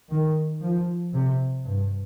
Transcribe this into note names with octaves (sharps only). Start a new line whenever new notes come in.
D#3
F3
C3
G2